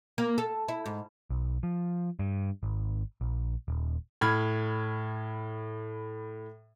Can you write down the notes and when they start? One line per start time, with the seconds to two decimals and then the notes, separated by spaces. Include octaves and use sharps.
0.18 A#3
0.38 A4
0.68 E4
0.86 G#2
1.30 B1
1.63 F3
2.19 G2
2.63 G#1
3.21 A#1
3.68 D#1
4.21 A2 B5 F6 G#6